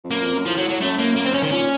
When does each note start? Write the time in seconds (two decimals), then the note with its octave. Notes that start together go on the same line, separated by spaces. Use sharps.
0.04 F2
0.10 F#2 A#3
0.22 F2
0.34 F#2
0.46 A2 F3
0.57 F#3
0.69 F#3
0.81 F#2 A3
0.99 A#3
1.16 A#3
1.25 C4
1.34 C#4
1.43 D#3
1.52 A#2 C#4